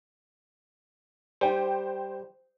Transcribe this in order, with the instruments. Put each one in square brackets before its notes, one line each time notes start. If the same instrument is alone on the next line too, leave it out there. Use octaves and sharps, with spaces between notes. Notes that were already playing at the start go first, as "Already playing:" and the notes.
[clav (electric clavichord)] G3 [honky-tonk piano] C5 G5